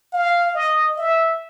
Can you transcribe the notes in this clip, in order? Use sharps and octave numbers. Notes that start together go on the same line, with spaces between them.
F5
D#5
E5